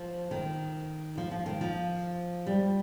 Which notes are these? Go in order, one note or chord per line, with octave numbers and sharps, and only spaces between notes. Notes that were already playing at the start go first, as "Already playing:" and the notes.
Already playing: F3
D#3
F3
F3
D#3
F3
G3